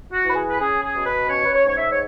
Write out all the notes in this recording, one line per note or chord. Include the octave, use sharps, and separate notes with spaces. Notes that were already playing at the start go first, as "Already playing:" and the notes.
F#4
E3 B4
G#4
B4
C#4 G#4
G#4
B2
B4
C#4 C#5
B4
C#5
G#2 C#5
E5
C#5